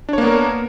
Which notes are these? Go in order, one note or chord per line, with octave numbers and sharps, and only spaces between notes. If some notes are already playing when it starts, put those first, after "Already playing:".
A#3 B3 D4 A#4 C#5